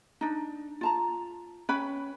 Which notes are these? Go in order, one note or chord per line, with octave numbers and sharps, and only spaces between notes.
D4 D#4
F4 A5 A#5
C#4 B4 G5 B5